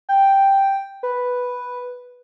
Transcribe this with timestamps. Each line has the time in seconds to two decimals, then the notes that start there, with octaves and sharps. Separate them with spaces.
0.09 G5
1.03 B4